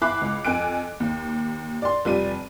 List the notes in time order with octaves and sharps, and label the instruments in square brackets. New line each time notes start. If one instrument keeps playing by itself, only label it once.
[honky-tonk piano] E2 E4 B5 D6 F#6 C7
C#2
F2 G#5 F#6 D7
D#2
D5 C6
F1 F3 G3 D5 D#7